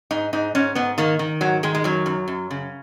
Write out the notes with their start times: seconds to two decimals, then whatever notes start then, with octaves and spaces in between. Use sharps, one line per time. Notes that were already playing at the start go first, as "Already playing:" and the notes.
0.11 G#2 D#4
0.33 G#2 D#4
0.55 G#2 C#4
0.75 G#2 B3
0.98 D#3 A#3
1.19 D#3
1.41 G#2 F#3
1.63 D#3 G#3
1.75 G#3
1.84 F#2 F#3
2.06 F#2
2.28 F#2
2.51 C#3